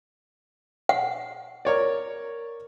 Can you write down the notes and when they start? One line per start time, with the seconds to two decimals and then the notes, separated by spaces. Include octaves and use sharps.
0.89 F#5
1.65 A#4 C#5 D5